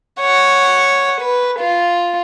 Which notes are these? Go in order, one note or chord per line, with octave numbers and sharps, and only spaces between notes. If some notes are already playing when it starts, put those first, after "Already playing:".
C#5 F#5
B4
F4